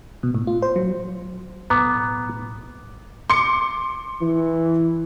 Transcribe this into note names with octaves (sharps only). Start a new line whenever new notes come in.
B2
A2
F4
C5
F#3
B1 A2 B3 A#5 D6
C6 D6 C#7
E3